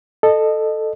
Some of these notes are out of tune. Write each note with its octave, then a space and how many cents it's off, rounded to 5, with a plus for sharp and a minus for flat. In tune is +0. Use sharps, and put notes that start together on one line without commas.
A4 +0 D#5 -25